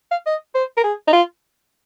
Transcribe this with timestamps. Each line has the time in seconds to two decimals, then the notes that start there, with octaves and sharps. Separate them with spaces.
0.11 F5
0.26 D#5
0.55 C5
0.77 A#4
0.84 G#4
1.07 D#4
1.13 F4